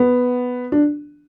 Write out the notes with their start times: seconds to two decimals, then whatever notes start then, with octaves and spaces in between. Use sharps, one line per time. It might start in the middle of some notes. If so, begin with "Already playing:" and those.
Already playing: B3
0.72 D4